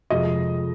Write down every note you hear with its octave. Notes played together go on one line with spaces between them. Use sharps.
F1 F2 F3 G#3 D#5